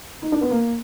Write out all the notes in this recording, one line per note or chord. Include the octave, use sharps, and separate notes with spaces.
D#4
D4
B3
A#3